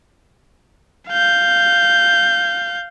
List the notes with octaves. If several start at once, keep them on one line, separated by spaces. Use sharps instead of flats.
F5 G6